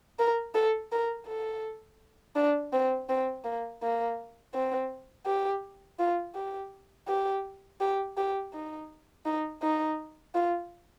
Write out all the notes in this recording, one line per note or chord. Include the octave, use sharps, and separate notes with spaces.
A#4
A4
A#4
A4
D4
C4
C4
A#3
A#3
C4
G4
F4
G4
G4
G4
G4
D#4
D#4
D#4
F4